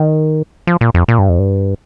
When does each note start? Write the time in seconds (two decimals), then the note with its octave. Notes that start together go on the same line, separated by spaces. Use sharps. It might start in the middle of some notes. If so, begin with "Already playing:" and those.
Already playing: D#3
0.67 F3
0.81 A#2
0.94 F2
1.08 A#2
1.19 G2
1.29 F2
1.39 G2